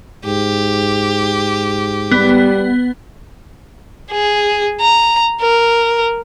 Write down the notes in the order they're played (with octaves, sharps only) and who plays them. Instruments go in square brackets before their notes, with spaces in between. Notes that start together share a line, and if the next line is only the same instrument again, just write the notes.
[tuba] G#2 [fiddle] G4
[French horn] G3 [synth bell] B3
[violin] G#4
A#5
A#4